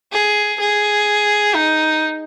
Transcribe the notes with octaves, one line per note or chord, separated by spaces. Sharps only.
G#4
G#4
D#4